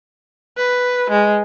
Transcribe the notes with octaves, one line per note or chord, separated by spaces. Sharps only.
B4
G#3